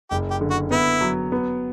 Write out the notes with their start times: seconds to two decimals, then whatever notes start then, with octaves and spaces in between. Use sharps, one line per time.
0.10 F#1 G4
0.30 G4
0.41 D3
0.50 F#4
0.71 B3 E4
1.01 F#3
1.32 B3